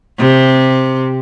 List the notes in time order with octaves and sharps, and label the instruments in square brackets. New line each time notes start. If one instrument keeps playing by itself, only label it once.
[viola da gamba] C3